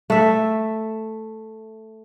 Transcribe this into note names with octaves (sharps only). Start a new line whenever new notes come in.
A3 E5